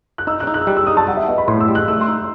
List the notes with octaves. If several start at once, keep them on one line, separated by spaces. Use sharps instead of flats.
F#6
D#4 E6
F#6
D#4
F#6
E6
G3 F#6
E6
D#4 D#6
A5
G3 F#5
E5
B3 D#5
B5
A2 C6
E6
G3
F#6
A3 E6
C6
D#4